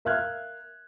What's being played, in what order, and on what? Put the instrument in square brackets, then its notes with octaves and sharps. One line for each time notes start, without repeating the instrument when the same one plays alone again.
[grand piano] A#4 E5 F5 F6 F#6 G#6